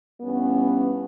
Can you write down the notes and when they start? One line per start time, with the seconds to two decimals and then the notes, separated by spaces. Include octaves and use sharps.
0.21 G2 E3 B3 C#4